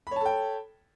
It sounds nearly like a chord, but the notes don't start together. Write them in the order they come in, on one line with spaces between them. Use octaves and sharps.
B5 C#5 A5 A4 G5